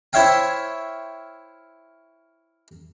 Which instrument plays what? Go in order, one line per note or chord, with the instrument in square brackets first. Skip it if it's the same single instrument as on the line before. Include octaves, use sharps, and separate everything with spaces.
[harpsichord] E4 C5 C#5 E5 F5 G5